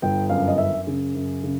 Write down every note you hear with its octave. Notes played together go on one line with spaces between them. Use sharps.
G1 G5
F#2 F5
D#5
F#2 E5
C#3
F#2
C#3